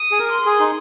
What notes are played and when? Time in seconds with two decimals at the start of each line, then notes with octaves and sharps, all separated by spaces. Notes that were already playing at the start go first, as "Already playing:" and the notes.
Already playing: D#6
0.11 G#4
0.19 A#4
0.32 C6
0.45 G#4
0.60 D#4